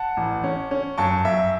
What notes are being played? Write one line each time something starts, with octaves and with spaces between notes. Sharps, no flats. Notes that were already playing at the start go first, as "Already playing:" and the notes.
Already playing: F#5 A5
A1
C#4
C#4
F#2 A5 C#6
F#2 E5